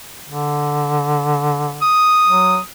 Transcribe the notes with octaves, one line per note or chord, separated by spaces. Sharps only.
D3
D#6
F#3